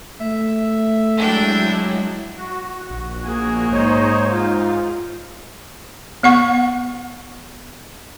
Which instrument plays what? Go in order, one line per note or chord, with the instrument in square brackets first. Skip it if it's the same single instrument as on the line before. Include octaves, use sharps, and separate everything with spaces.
[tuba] A3 [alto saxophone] E5
[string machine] F#3 G#3 E4 [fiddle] D4 G5
[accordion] F#4
[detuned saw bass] A#1 [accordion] F#4
[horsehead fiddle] A#3 [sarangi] G#4
[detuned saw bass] G#2 [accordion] D#4 C5 C#5 [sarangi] D#5
[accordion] D#4 [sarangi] F4
[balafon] B3 F#5 C#6